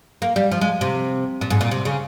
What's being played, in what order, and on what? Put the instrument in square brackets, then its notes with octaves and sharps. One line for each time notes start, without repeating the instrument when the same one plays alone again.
[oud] A#3
G3
F3
G#3
C3
A#2
G#2
A#2
C3
C#3